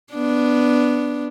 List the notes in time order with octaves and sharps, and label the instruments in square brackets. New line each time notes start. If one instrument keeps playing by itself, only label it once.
[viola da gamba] B3 D4